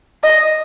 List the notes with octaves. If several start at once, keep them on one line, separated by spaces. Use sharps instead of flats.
D#5